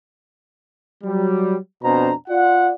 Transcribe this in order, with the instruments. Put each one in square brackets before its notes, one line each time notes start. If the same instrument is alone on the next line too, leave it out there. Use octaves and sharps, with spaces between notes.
[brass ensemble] F#3 G3
F2 B2 C4 D4 C5 A#5
F4 D5 F#5